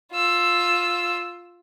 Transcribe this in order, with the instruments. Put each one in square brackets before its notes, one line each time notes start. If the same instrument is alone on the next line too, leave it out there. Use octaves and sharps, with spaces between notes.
[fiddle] F4 E6